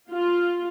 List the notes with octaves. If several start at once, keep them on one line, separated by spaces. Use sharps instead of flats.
F4